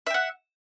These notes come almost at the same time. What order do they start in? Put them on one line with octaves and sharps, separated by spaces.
E5 G5 F#5